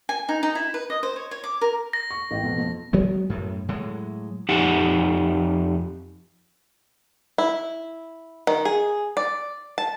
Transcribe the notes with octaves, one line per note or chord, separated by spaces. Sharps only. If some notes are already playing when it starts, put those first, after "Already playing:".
G#5
D#4
D#4
E4
B4
D#5
C5
C#5
C#5
D6
A#4
A#6
C#6
A1 G5
F2 B2
F2
F#3 G#3 B3
F#2 A2
A2 F#3 G#3
F2 D#4 G4 F#5
E4
D#3
G#4
D5
A5